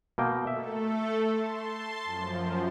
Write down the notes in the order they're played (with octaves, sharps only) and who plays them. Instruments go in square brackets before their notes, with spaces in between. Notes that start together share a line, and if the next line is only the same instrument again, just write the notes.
[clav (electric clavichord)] B2 A#3 G5
[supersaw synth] A3 A4 [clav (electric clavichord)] E5
[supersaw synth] A5 C6
F#2 F3